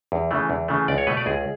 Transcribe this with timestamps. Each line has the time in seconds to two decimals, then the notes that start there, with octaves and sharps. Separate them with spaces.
0.12 E2
0.31 C#3 E3 A3
0.50 E2
0.68 C#3 E3 A3
0.88 C#2 D5
0.98 C#5
1.07 B2 A3 B4
1.17 D5
1.26 C#2 G#4